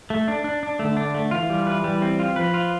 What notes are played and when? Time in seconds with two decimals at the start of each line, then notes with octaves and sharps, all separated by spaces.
0.10 A3
0.28 D4
0.44 D4
0.63 D4
0.79 D3 A3
0.97 D4
1.14 A3
1.31 E3 F4
1.50 G3
1.67 B4
1.84 G3
2.02 C4
2.19 F4
2.36 F3 B4
2.54 F4